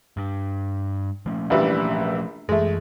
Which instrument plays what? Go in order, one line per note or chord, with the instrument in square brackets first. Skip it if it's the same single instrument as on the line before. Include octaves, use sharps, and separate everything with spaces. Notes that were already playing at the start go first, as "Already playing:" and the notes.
[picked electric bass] G2
F3 A3 C#4
[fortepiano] A#1 E3 G3
[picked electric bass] F#2 E3 [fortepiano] G#3 A3